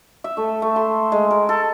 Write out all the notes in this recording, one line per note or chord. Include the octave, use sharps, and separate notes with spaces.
E5
A3
A3
C6
G#3
A#4
A4